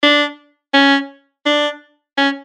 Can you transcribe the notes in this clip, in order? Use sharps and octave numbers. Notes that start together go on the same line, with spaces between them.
D4
C#4
D4
C#4